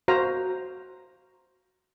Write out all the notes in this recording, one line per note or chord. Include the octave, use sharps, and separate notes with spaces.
F#4 C5 F5 A#5